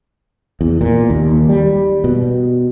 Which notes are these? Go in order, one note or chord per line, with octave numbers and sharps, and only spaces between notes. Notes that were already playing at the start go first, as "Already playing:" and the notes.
E2
A#2
D#2
G3
B2